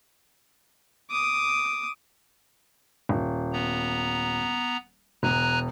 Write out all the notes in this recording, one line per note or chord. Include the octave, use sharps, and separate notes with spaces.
D6 D#6
D#1
B3 A#5
E1 G#5 A#5 F#6